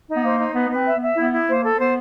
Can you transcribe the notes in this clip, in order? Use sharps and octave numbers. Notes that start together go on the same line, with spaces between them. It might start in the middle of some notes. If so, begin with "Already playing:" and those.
D#4
B3
A#3 C5
D#4
B3 B4
B3
C4 B4
E5
B3
E5
B3 E4
E4
A#3 C5
A4
B3 C5